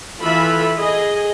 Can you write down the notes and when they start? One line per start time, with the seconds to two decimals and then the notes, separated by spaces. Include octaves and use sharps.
0.19 E3 F4 A4 E5 B5
0.77 G#4 D#5